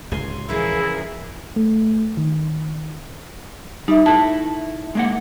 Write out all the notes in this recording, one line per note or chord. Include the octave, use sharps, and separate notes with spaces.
D1 C#2 G#5 C6
C#3 E3 F3 E4 G#4 A#4
A3
D#3
G3 D#4 E5
E4 A4 A5
G#3 A#3 F#5